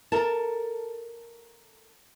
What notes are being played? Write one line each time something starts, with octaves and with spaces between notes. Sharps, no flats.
A4 A#4 A5